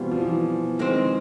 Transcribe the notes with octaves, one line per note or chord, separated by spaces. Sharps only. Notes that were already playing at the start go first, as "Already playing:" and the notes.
Already playing: B2 E3 G3 C4 F4
F3
E3
D#3 G#3 C4